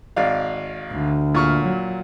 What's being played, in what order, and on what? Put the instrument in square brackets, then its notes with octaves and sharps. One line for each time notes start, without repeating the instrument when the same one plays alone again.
[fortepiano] G#1 D5 F5
[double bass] D2
[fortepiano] A#2 C#6 F6
[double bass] F#3